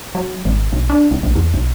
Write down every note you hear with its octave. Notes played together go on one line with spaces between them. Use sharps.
F#3
G#1
B1
D4
C2
A#1
E2
B1